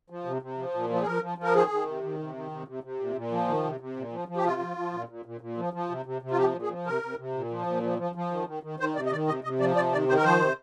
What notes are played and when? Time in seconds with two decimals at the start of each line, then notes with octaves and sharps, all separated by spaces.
0.10 F3
0.25 C3
0.42 C3
0.58 F3
0.74 A#2
0.90 F3
1.02 G#4
1.06 F3 A#4
1.23 F3
1.38 F3
1.43 A#4
1.55 D#3 G#4
1.71 D#3
1.87 C3
2.03 D#3
2.19 C3
2.35 D#3
2.51 C3
2.68 C3
2.84 C3
3.00 A#2
3.16 A#2
3.32 F3
3.48 D#3
3.64 C3
3.80 C3
3.97 A#2
4.12 F3
4.28 F3
4.37 G4
4.44 C3 F4
4.61 F3
4.77 F3
4.93 A#2
5.09 A#2
5.25 A#2
5.41 A#2
5.57 F3
5.73 F3
5.89 C3
6.06 C3
6.22 C3
6.31 F4
6.38 F3 G4
6.54 A#2
6.62 G#4
6.70 F3
6.86 C3 A#4
7.02 C3
7.18 C3
7.34 A#2
7.51 F3
7.67 A#2
7.83 F3
7.98 F3
8.15 F3
8.31 D#3
8.47 D#3
8.63 D#3
8.80 D#3 C5
8.95 C3 D5
9.06 D#5
9.12 D#3 D5
9.28 C3 D#5
9.44 C3 D#5
9.60 F3 D5
9.76 C3 D5
9.92 D#3 D5
10.08 D#3 C5
10.17 A#4
10.24 F3 C5
10.41 C3